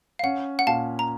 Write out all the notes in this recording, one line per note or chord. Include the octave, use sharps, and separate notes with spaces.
F5
C#4 F#5
F#5
A#2 F5 A5
A#5